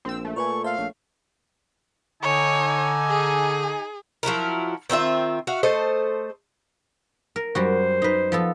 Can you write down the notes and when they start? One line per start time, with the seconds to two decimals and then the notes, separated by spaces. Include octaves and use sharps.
0.05 A#1 C4 E6
0.25 A3
0.36 A#2 A#4 B4 G#5 C#6
0.64 C5 E5 F5 A5
0.78 A#1 C#5
2.23 D3 D#4 C#5 G#5
3.09 G#4
4.23 F3 F#3 E4 A#4
4.90 D#3 C4 F4 E5
5.47 F#4 E5 F5
5.63 A3 A4 C5 D#5
7.36 A#4
7.55 F#2 G3 F#4 C5
8.02 D#4 B4
8.32 F3 B3 A4